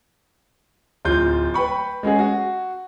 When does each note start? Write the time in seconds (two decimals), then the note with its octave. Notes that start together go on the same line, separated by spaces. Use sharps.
1.05 D1 F4 G6
1.54 B4 G5 B5 C#6
2.03 G#3 C#4 F#4 G#4
2.19 F#4